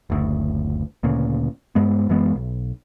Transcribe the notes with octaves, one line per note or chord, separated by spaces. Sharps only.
F#1 D2
D2 A#2 C#3
G2 G#3 B3
F#2 E3 G#3 B3
B1